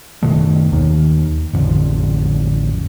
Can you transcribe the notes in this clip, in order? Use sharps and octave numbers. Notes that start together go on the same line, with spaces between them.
F#1 B2 D#3 A3
D#2 D#3
A1 F2 D3 F3